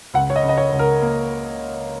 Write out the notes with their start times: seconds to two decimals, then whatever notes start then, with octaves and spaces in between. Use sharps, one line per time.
0.14 C#2 F#5
0.30 C#5
0.36 D#5
0.43 C#3
0.49 D#5
0.58 C#5
0.72 C#2
0.79 A#4
1.02 A#3